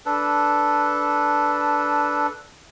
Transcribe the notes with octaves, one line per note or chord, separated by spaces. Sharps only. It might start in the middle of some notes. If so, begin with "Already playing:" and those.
D4 A4 B4